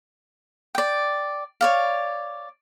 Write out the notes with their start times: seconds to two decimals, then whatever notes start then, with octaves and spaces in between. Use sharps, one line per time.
0.75 D5 G5
1.61 C#5 D5 F5